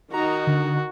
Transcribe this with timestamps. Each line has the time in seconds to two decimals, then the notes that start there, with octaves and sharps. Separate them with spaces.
0.13 D#3 D#4 F#4 A#5
0.47 D3